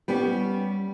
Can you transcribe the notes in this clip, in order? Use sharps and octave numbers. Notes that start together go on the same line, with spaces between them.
G3 B3 C#4 G4